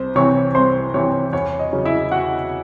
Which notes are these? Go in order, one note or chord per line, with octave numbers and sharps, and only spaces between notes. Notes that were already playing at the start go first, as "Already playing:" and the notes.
Already playing: C2 C5
C3 E3 C4 C#5 C#6
C2 C5 C6
C3 E3 C4 C#5
E2 C#5
D#5
C#3 F#3 C#4
E4 E5
E2 F#4 F#5